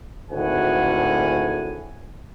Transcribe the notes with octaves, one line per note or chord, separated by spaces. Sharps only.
G#1 D2 A2 F#5 G#5